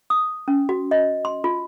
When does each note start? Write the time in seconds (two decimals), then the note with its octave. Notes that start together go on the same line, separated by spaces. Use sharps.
0.10 D#6
0.48 C#4
0.69 F#4
0.91 D#5
1.25 C6
1.44 F4